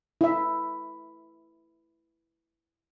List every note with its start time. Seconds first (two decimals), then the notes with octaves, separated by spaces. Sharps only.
0.21 E4 E5